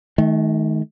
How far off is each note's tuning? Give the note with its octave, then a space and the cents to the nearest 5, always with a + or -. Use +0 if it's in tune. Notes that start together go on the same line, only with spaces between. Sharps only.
D#3 +15 A3 -35